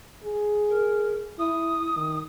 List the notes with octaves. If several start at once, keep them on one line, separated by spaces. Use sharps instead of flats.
G#4
A#4
E4 D#6
D#3